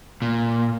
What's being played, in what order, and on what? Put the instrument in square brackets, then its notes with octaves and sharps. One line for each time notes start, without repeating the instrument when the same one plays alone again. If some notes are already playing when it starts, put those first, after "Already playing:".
[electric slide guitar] A#2